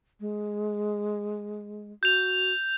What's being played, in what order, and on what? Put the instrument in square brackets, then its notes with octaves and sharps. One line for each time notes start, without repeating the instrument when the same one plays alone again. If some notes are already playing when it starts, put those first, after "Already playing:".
[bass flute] G#3
[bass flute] F#4 [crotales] G6 F7